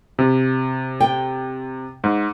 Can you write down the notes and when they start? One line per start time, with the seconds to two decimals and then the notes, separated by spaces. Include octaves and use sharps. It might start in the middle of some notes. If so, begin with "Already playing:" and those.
0.19 C3
1.00 G5
2.04 G#2